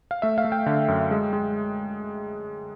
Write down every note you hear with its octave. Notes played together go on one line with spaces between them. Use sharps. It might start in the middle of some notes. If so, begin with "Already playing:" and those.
F5
A3 E5
F5
A3
G5
D3
F#2
G#3
G#3